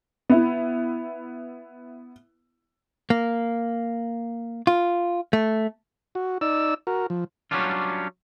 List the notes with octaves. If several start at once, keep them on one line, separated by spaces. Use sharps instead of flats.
B3 E4
A#3
F4
A3
F#4
D#4 D5 E6
F#4 A#4
F3
F#3 G3 C#4 D4 F4